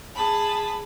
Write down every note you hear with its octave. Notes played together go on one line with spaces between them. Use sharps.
G#4 A5 B5